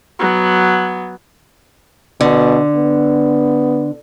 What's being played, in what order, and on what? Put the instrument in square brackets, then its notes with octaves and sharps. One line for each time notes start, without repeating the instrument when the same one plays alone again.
[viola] F#3 B3
[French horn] B2 [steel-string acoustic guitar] D3
[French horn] B3